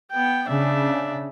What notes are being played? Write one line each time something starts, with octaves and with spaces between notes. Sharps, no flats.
B3 G5
C#3 D4 E5